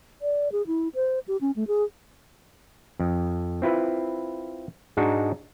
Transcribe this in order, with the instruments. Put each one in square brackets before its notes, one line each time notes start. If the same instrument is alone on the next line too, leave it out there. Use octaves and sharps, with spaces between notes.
[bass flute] D5
G#4
E4
C5
G4
C#4
A3
G#4
[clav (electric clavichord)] F2
C4 E4 F4 B4
G#2 G#3 D4 D#4 F#4